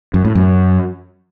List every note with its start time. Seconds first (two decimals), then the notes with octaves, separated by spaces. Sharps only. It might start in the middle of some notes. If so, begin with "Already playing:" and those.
0.14 F#2
0.25 A2
0.35 F#2